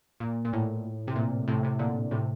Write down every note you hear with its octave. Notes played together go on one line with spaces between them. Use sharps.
A#2
A#2
A2
C3
A#2
A2 C3
A2 C3
A#2 D3
A2 C3